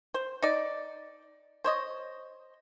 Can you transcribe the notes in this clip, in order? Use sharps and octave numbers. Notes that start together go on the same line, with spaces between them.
C5
D#4 D5
C5 C#5 D#5